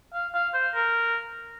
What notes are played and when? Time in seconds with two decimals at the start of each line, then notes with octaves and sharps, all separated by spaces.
0.13 F5
0.34 F5
0.54 C5
0.75 A#4